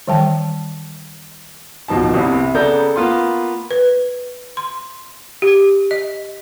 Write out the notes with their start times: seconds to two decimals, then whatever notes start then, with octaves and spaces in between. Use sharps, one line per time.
0.08 D#3 E3 G3 G5 A5
1.88 D1 B2 F3 D#4 A5
2.13 G1 C2 G2 C3 E4
2.54 C#3 B3 A4 D5 A#5 G6
2.96 A#3 B3 F4 C6
3.71 B4
4.57 C6
5.42 G4
5.91 D#5